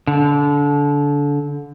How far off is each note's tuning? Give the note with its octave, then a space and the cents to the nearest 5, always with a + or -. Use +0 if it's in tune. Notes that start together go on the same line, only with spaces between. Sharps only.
D3 -25